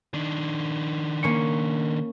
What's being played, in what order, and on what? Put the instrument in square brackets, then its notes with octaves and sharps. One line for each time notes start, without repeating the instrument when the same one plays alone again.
[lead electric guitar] D#3 D4
[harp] A#3 C#4 C#7